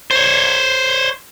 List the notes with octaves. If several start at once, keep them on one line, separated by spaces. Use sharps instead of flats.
C5 C#5